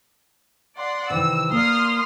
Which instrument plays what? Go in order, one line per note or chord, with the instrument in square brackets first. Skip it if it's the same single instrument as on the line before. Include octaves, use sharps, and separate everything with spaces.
[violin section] D5 F#5 C6
[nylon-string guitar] C3 D#3 E3 [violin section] E6
[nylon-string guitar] A#3 D5 [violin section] C6 D#6 F6